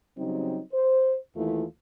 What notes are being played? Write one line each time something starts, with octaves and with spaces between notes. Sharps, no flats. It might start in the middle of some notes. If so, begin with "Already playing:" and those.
C#3 F#3 G3 C4 D#4
C5
D#2 E3 A3 E4 F4